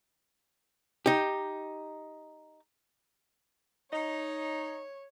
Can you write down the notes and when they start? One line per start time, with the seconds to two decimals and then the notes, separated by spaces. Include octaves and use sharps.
1.06 D#4 G4
3.93 D#4 C#5 D#5